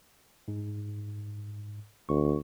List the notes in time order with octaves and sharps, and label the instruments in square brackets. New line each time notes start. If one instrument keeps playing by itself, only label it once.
[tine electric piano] G#2
[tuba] D2 [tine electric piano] C#6